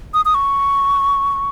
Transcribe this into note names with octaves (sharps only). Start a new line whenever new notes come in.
D#6
D#6
C#6